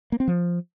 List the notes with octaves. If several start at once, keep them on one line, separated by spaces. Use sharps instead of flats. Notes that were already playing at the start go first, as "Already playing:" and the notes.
A#3
C4
F3